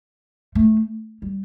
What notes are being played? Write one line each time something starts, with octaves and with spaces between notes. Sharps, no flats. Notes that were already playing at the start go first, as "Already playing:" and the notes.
A3
G3